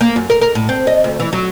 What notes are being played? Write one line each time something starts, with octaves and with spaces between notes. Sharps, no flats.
A#3
F#2
A#4
A#4
A2
C4
D#5
D2
E3
F#3